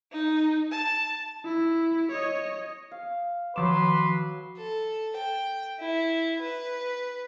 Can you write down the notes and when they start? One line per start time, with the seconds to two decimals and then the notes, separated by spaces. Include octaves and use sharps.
0.12 D#4
0.72 A5
1.45 E4
2.11 C#5 D#5
2.91 F5
3.56 D#3 F3 F#3 B4 C6 D6 E7
4.57 A4
5.16 G5
5.80 E4
6.43 B4